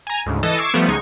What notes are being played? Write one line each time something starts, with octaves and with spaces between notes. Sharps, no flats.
G#5 A#5
D2 G#2 C#3
E3 A4 D#5 A6 E7
C#6 D6 E6 G#6 C7 C#7
F3 G3 A3 B3
C#2 G#3 D#4 C#6